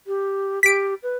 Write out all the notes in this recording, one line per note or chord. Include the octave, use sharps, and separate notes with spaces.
G4
G4 B6 D7
B4